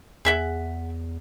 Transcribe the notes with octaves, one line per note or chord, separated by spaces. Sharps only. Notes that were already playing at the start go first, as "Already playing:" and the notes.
E2 G#4 E5 F#5